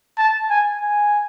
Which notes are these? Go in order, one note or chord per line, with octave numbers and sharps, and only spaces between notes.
A5
G#5
G#5